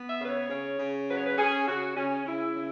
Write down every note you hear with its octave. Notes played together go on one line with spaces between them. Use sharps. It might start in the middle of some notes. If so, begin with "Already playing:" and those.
Already playing: B3
E5
C#3
B4
C#5
C#3
C#3
F#3 B4
C#5
B4
C#4 G#4
C#3 F#4
C#3 C#4
C#3 E4
C#3